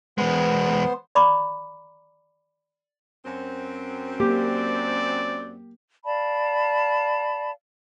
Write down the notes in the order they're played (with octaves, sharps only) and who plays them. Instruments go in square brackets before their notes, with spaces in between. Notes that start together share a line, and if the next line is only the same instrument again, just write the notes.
[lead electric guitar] E2 G#3 [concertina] B3 C5
[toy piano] D5 A#5 B5 C#6 D6
[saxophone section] F#2 C4
[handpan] F#3 A#3 [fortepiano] G4 [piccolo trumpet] D5
[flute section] D5 F5 A5 B5